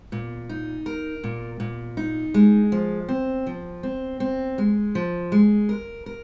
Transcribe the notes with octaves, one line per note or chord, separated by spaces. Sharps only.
A#2
D#4
A#4
A#2
A#2
D#4
G#3
F3
C4
F3
C4
C4
G#3
F3
G#3
A#4
A#4